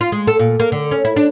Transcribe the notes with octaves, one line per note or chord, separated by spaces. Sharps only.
F4
G#3
A4
A#2
A#3
D3
C#4
E4
D4